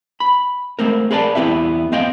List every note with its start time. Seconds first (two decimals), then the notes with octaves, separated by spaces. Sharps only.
0.20 B5
0.79 G#3 A3 C4 A#4
1.11 G#4 A#4 B4 D5 A5
1.35 E2 B3 C4 E4 G4 E5
1.92 B3 C4 D#5 F5 G5